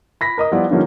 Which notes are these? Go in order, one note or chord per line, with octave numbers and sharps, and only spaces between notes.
B5 A#6 B6
A#4 D#5 D#6
F3 G3 B3 E4 F4 D5
D3 F3 G3 A#3 C#4 D#4